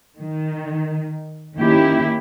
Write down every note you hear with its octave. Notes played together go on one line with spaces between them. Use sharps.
D#3
D#3 A#3 C#4 E4 G4